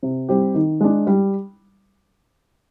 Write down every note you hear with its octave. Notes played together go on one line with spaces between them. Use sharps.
C3
G3 C4 G4
D#3
G#3 D4
G3